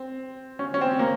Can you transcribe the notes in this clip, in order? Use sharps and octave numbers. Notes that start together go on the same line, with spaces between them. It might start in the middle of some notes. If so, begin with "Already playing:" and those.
Already playing: C4
C#4
C#4
C4
A#3